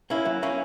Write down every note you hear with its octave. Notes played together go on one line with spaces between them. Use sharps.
A#3 C#4 E4
F#3
A#3 C#4 E4